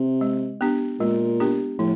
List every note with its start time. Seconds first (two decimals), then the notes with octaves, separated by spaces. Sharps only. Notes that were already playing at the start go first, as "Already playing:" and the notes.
Already playing: C3
0.21 G#3
0.61 B3 D4 G4
1.00 A#2 G#3
1.40 B3 D4 G4
1.79 A2 F3